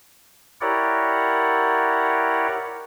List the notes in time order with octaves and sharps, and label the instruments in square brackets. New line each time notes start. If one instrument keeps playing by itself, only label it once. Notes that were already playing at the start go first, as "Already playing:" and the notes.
[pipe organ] E4 G4 A#4 C#5 D5 F#5